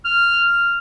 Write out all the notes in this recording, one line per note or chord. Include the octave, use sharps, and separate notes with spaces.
F6